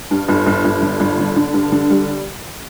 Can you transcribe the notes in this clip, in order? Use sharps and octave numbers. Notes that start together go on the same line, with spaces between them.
G2
G1
G1
G1
D3
G1
D3
D3
G2
D3
G3